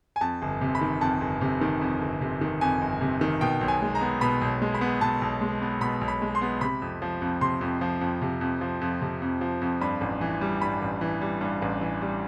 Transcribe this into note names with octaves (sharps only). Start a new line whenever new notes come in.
G#5
F2 A5
G1
C3
B5
D#3
F2 A5
G1
C3
D#3
F2
G1
C3
D#3
F2 G#5
G1
C3
D#3
B2 G5
B1
G#5
G#3
A#5
B3
B2 B5
B1
G#3
B5
B3
B2 A5
B1
G#3
B3
B2 B5
B1
B5
G#3
C6
B3
C3 B5
F2
F3
F2
C3 C6
F2
F3
F2
C3
F2
F3
F2
C3
F2
F3
F2
G2 B5
A1
E3
G3
G2 B5
A1
E3
G3
G2
A1
E3
G3